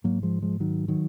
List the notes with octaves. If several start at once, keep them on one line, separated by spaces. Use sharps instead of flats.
G#2 F#3 A#3
F3 G#3
F3 G#3
D#3 F#3
D#3 F#3